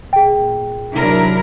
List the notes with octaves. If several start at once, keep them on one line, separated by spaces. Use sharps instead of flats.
A#2 G#4 G5
C3 D#3 F#3 D4 E4 A#4